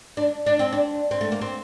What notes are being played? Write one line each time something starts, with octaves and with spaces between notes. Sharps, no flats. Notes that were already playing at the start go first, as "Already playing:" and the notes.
D4
D4
C4
D4
C4
A3
A#3
C4